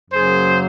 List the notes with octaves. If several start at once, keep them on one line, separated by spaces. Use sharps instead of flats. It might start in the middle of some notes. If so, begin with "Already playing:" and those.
F#2 C#3 F#3 A#3 G#4 C5